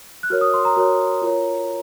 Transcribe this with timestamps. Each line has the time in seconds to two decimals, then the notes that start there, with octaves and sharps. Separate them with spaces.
0.23 F#6
0.30 F#4 A#4 C#5 F6
0.41 D#6
0.54 C6
0.65 A#5
0.77 F#4 A#4 C#5
1.22 F4 A#4 C#5